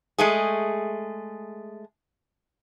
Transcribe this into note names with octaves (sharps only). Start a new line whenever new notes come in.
G#3 A3 G#4